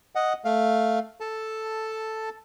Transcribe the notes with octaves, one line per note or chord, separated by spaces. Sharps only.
D#5 F#5
A3 F5
A4 A5